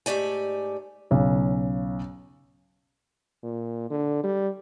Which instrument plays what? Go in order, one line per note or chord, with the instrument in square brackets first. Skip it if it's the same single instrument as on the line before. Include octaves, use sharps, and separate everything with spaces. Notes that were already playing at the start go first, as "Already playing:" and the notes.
[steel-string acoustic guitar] G#2 A3 G4 D5 G#5
[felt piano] B1 C#3
[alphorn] A#2
D3
G3